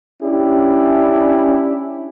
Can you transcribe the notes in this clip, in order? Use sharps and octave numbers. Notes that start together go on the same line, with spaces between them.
C#4 D4 E4 G4